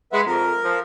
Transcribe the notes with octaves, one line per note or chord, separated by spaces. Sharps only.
G#3 B4 E5 F#5
F2 A#4
F3